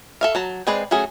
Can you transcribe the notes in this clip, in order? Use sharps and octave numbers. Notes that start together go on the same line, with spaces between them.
A4 E5 F5
F#3 A5 A#5
G#3 C4 G#4 B4 D5
F#3 A3 C#4 F#4 G#4